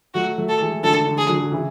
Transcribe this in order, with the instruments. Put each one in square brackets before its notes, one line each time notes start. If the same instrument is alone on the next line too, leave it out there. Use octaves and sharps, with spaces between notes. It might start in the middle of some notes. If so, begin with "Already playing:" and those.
[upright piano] F#3 A3 [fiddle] F#4
[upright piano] F#3 A3
[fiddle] A4
[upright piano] E3 G#3
[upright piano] D3 F#3 [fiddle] A4
[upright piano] D3
[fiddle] G#4
[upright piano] D3 F#3
C#3 E3